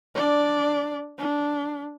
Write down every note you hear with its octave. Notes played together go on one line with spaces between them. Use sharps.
D4 D5
D4